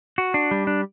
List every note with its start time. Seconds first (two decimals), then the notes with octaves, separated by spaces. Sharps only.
0.18 F#4
0.34 D4
0.51 G3
0.67 D4